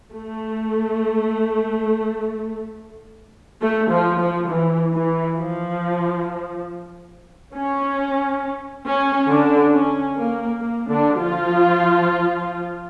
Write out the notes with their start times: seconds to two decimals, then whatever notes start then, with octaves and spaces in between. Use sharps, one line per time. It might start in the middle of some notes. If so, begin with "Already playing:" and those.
0.12 A3
3.62 A3
3.91 F3
4.19 F3
4.49 E3
4.93 E3
5.36 F3
7.55 C#4
8.86 C#4
9.29 D3 D4
9.73 C#4
10.17 A#3
10.61 A#3
10.90 D3 D4
11.19 F3 F4